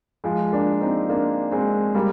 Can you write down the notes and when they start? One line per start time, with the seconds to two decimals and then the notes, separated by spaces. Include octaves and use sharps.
0.24 F3 G#3
0.52 A#3 D4
0.81 C4 D#4
1.09 A#3 D4
1.51 G#3 C4
1.94 G3 A#3